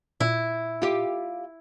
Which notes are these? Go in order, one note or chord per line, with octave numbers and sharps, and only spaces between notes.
A#2 E4
F4 G4